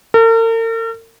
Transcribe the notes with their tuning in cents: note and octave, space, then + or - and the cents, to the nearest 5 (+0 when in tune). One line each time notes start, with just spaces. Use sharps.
A#4 -45